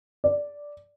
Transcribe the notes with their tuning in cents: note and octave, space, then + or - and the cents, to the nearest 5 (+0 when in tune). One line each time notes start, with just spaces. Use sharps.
D5 -5